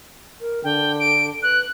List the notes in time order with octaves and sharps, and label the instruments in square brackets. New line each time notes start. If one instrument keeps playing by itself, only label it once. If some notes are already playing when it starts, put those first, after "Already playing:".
[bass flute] A#4
[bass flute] D3 [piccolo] G5
[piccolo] D7
[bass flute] B4 [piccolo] F#6